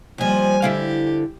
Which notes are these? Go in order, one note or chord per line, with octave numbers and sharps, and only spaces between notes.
D#2 F3 G3 G#5
D3 E4 G4 F5